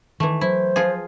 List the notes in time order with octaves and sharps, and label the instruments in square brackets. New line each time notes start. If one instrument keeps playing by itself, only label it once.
[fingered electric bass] D#3 [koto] E3 A3
[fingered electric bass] F#3 [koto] E4 [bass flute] C5
[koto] F3 F4 G#4